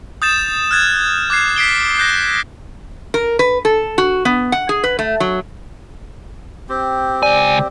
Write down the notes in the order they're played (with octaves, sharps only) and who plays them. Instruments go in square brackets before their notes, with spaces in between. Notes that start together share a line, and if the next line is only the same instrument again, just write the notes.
[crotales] D#6 G6 A6 E7
F6 F#6 G#6 A6
D6 F#6 G#6 C7
B6 C7 D7 G7
F#6 G6 A#6 C7
[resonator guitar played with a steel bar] A#4
B4
A4
F#4
B3
F#5
G#4
B4
A3
F#3
[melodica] C4 G4
[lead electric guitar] C#2 G#5 [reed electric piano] D5